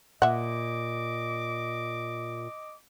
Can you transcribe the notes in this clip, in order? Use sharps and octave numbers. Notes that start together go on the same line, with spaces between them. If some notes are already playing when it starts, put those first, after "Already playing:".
A#2 D#5 E5 F#5 D6